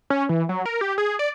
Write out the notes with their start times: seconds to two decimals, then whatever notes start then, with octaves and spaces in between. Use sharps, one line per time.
0.10 C#4
0.29 E3
0.49 F#3
0.66 A#4
0.81 G4
0.98 G#4
1.19 D5